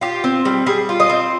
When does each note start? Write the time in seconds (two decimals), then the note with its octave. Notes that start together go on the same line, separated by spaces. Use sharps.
0.01 F4 G4
0.24 C4
0.45 G3
0.66 G3 G#4
0.89 F4
1.00 D#5
1.10 C4